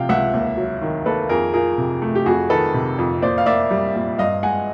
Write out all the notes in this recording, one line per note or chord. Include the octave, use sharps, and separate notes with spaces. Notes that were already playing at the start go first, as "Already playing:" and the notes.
Already playing: C3 F3 F5 G5
C#2 E5 F#5
D#2
F#3
D#3
A#3 A4 B4
F2 G#4 A#4
F3 G#4 A#4
C3
A3
G4
F2 F#4 G#4
D#3 A4 B4
C3
F2
A#2 C5 D5
F5
A#3 D5 E5
G3
A#2
G2 D#5 F5
G#3 F#5 G#5